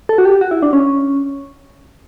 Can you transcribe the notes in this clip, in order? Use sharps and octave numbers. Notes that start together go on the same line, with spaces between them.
A4
F#4
G4
F#4
E4
D4
C#4